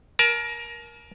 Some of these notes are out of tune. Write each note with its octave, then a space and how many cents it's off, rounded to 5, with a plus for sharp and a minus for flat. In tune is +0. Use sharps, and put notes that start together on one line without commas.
A#4 +20 A5 -40